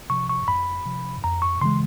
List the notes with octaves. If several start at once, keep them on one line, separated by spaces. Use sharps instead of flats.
C3 F3 C#6
C#6
F2 B5
C3 F3
F2 A#5
C#6
C#3 E3 G#3 C6